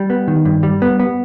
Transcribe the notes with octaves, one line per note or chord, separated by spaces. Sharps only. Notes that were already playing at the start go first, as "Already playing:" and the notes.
Already playing: G3
B3
D#3
G2
G3
B3
B3